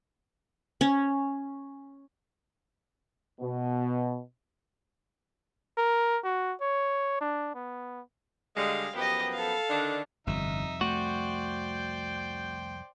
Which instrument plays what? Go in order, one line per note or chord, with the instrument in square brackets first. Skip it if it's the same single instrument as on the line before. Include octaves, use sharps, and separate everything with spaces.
[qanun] C#4
[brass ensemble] B2
[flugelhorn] A#4
F#4
C#5
D4
B3
[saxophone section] D3 G3 G#3 [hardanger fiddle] F5
[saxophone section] F#2 F3 B3 [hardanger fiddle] G4 D#5
[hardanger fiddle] A4 F5
[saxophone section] D3 D#3 D4
[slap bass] G1 [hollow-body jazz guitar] C2 F2 C3 [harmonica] D#4 E5
[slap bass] A3 [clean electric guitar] F#4 [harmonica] C5 D5 G5